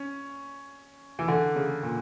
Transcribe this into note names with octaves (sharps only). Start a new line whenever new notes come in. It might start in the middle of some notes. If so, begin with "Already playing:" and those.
Already playing: C#4
E3
D3
C#3
A#2